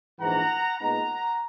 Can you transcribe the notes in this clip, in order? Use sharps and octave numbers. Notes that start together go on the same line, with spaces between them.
A#1 G#2 E3 F#5 A#5
A#2 G#3 B3 D#4 F#5 A#5